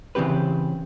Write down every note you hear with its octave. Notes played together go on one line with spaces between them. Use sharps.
C#3 E3 C4 G4 B4